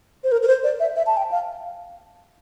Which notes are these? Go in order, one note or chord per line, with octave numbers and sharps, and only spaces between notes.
C5
A#4
A#4
C5
D5
E5
E5
A5
G5
F5